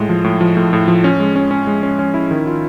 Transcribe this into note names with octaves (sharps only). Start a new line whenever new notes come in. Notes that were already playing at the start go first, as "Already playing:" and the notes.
Already playing: A2 G#3
F3
A2
F3
A2
A2
F3
C#4
G#3
C#4
C#4
G#3
C#4
C#4
E4
D#3
F4